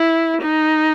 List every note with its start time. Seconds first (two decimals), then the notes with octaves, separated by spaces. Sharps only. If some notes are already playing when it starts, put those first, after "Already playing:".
Already playing: E4
0.42 D#4